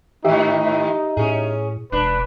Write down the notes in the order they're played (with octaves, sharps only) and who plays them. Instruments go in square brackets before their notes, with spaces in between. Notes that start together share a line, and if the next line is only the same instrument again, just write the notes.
[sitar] G#2 D#3 [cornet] D#4 [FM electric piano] G4 E5
[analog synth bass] A2 [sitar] C#4 G#4
[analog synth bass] E1 [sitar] D4 [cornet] B4